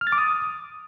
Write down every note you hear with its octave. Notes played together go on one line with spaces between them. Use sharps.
F6
A6
D6
D#6